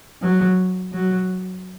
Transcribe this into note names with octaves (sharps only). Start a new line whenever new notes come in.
F#3
F#3